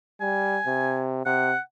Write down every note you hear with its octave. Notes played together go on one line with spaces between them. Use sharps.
G3 G#5
C3
C3 F#5